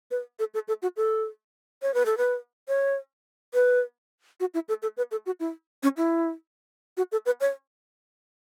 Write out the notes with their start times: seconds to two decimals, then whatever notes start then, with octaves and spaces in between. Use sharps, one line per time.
0.11 B4
0.39 A4
0.54 A4
0.68 A4
0.82 F#4
0.97 A4
1.82 C#5
1.94 B4
2.06 A4
2.18 B4
2.68 C#5
3.54 B4
4.40 F#4
4.54 E4
4.69 A4
4.82 A4
4.97 B4
5.11 A4
5.26 F#4
5.40 E4
5.83 C#4
5.97 E4
6.97 F#4
7.12 A4
7.26 B4
7.41 C#5